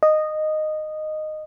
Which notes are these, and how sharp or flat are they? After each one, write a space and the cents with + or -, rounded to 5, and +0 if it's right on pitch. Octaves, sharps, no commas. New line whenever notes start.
D#5 -10